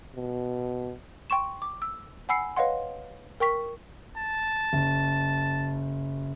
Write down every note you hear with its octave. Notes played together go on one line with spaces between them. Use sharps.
B2
G5 C6 C#6 E7
D6
E6
F#5 G#5 B5 E6 C7 C#7
B4 C#5 D#5 F5 F#5 C6
A#4 G5 C#6 B6
A5
F#1